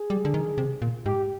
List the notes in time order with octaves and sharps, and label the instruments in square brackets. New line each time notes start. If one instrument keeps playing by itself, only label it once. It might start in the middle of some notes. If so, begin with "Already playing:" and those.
Already playing: [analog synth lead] G#4
[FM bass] G3
D3
D#3
C3
A#2
[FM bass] G#2 [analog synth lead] G4